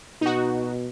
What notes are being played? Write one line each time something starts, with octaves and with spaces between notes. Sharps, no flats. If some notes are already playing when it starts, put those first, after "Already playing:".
B2 D#4 F#4